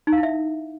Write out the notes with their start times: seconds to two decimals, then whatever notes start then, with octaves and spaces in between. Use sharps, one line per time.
0.07 D#4
0.12 F5
0.18 E4
0.23 E5